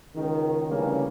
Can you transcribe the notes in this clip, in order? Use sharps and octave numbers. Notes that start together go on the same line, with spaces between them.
C#2 D#3
D2 C#3 E3 G3 A#3 C#4